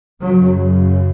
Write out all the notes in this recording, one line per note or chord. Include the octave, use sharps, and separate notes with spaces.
F#2 C#3 F#3